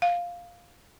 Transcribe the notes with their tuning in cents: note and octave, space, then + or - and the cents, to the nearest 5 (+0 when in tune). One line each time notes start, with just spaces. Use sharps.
F5 +5